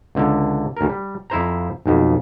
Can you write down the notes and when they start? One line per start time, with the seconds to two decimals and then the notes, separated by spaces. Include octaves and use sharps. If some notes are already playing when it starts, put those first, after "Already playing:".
0.15 C#2 D3
0.77 D2 A#4
0.90 G3
1.30 F2 E4 C5 A#5
1.86 B1 F2